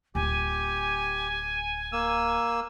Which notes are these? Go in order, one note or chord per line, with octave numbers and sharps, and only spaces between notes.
D1 F4 G4 G#5
A#3 E6